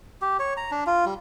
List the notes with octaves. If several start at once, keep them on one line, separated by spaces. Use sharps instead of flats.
G4
C#5
A#5
D4
F4
G3